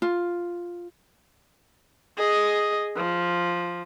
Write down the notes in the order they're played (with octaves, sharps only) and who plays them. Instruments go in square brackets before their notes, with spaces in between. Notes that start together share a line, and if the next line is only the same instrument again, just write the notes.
[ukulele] F4
[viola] G#4 D#5
F3